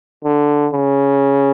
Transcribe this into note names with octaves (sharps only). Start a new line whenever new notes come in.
D3
C#3